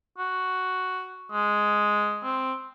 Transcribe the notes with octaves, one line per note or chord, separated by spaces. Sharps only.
F#4
G#3
C4